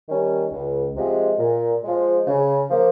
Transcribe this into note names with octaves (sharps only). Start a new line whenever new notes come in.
D#3 G3 C#4
C#2
C3 F3 G#3
A#2
F3 G#3
C#3
F3 A#3